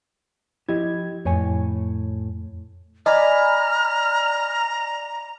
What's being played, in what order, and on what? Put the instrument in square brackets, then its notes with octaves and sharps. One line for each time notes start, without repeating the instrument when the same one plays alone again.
[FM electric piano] F3 G#6 [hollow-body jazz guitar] E4 G4 D#5
[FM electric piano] F2 [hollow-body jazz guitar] A2 C#5 G#5
[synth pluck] D5 G#5 B5 [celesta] D#5 [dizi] A#5 [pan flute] F6